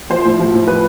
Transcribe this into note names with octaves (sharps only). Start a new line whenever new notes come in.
F3 C5
A2
F3
A2
F3 B4